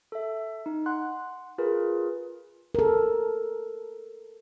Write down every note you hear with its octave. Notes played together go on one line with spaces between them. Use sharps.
A4 E5
D#4
F#5 C6 F#6
F4 G#4 A#4 B4
A4 A#4